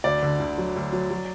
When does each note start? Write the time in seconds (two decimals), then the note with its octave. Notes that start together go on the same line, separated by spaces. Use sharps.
0.04 D2 D5
0.22 D3
0.40 D2
0.58 F#3
0.76 D2
0.93 F#3
1.10 F#3